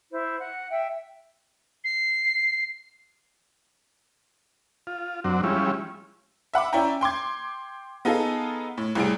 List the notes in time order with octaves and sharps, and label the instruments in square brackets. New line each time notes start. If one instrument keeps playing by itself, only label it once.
[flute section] E4 C5
F#5
E5 G5
[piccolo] C7
[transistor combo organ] F4
F#2 F#3 C4 D4
F3 G3 G#3 C#4 E4
[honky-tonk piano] E5 F#5 B5 D6
C#4 E4 D5 E5 G5 A#5
G5 C6 D6 G#6
B3 D#4 F4 G#4 A4
A2
C2 A2 C3 G3 G#4 D7